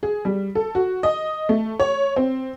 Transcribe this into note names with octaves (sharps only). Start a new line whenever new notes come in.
G#4
G3
A4
F#4
D#5
A3
C#5
C4